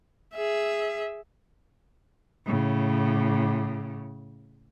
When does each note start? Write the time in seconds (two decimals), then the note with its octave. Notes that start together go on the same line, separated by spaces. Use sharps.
0.35 G#4 E5
2.46 A2 C#3